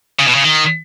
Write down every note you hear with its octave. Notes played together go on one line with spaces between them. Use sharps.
C#3
B2
C#3
D#3